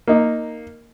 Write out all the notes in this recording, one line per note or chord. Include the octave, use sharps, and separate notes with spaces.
A#3 D#4